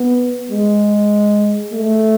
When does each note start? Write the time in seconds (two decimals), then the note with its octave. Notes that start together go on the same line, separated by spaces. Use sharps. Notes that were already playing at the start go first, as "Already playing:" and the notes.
Already playing: B3
0.51 G#3
1.73 A3